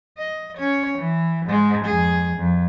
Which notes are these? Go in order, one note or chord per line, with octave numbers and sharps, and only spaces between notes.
D#5
C#4 C#5
E3
G#2 G#3
F2 G#4
F2